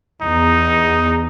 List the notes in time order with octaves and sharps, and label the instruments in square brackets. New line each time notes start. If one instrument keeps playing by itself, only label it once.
[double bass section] E2 [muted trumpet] D#4